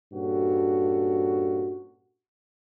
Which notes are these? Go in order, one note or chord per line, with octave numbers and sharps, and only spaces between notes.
G2 A#2 C#4 F#4 A4